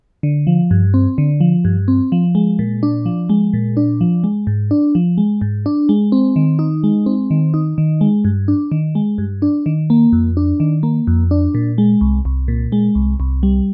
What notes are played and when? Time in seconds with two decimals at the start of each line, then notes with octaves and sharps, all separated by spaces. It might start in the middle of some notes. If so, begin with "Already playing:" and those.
0.23 D3
0.47 F3
0.71 G2
0.94 C4
1.18 D3
1.41 F3
1.65 G2
1.88 C4
2.12 F3
2.35 G#3
2.59 A#2
2.83 D4
3.06 F3
3.29 G#3
3.53 A#2
3.77 D4
4.01 F3
4.24 G#3
4.47 G#2
4.71 D4
4.95 F3
5.18 G#3
5.41 G#2
5.66 D4
5.89 G#3
6.12 C4
6.36 D#3
6.59 D#4
6.84 G#3
7.06 C4
7.31 D#3
7.54 D#4
7.78 D#3
8.01 G#3
8.25 G2
8.48 D4
8.72 D#3
8.95 G#3
9.18 G2
9.42 D4
9.66 D#3
9.90 A#3
10.13 F2
10.37 D4
10.60 D#3
10.83 A#3
11.07 F2
11.31 D4
11.55 A#2
11.78 G#3
12.01 C2
12.25 C2
12.48 A#2
12.72 G#3
12.95 C2
13.20 C2
13.43 G3